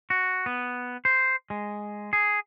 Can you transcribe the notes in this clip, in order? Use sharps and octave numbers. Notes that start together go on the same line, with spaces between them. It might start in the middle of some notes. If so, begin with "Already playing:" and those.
F#4
B3
C5
G#3
G#4